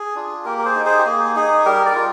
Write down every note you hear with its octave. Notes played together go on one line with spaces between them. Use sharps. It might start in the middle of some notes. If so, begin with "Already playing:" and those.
Already playing: G#4
D4 F4
A#3 G4 A#4
A#4
G#4 C5
D#4
G#4 C5
G4
A#3 G#4
D#4 G#4
G3 G4 A#4
A#4 D5
F4